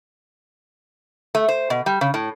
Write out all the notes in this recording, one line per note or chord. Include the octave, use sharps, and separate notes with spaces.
A3
C5
B2
G3
C#3
A2